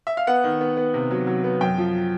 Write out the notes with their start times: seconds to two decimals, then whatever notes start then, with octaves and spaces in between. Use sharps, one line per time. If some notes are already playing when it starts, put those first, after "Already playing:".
0.07 E5
0.17 F5
0.27 B3 F#5
0.44 D#3
0.61 B3
0.77 B3
0.94 C3
1.11 F#3
1.27 F#3
1.44 B3
1.61 F#2 G5
1.78 F3